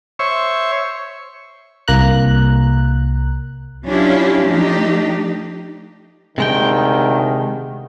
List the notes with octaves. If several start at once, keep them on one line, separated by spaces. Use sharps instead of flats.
C5 C#5 E5 C#6
C2 A#3 A#5 F#6
F#3 C#4 D4 E4 F4 G4
F3 A3 D4 D#4 G4
D2 C3 D#3 G#3 G5